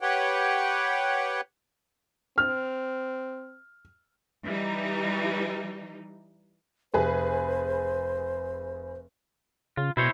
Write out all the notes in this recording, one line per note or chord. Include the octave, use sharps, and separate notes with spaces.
G4 B4 C#5 F#5 G5
C4 F6
E3 G3 D#4
F1 G#4 B4 C5
C#3 F4
B2 E4 C5 C#5